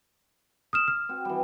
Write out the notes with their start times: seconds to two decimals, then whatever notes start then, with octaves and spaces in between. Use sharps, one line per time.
0.73 D#6 F6 E7
0.88 F6
1.09 C4 F#4
1.25 E3 G3